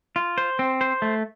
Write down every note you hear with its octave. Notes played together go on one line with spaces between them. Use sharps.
F4
C5
C4
C5
A3